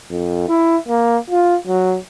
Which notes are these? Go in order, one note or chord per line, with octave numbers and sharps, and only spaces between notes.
F2
E4
A#3
F4
F#3